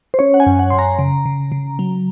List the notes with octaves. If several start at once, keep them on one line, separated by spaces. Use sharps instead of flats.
C5
C#4 C#5
F#5
G#5
F#2
F#5
F#2 C6
A#5
C#3
C#3
C#3
F#3